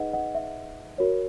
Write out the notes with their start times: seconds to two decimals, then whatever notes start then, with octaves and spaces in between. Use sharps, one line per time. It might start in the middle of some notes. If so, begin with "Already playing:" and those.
Already playing: D#4 G#4 B4 D#5 F#5
0.13 D#5 F#5
0.35 E5
0.98 F#4 A#4 C#5